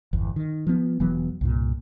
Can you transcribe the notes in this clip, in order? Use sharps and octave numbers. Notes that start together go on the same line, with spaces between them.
G1 E2
D#3
F3 B3
E1 E3 F#3 B3
C2 G2 A#2